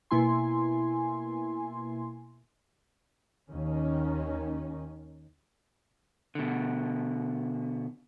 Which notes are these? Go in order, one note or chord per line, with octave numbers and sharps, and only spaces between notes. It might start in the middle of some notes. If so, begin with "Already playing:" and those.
B2 A#3 E4 G#5 C6
D#2 D#3 C#4
B2 D3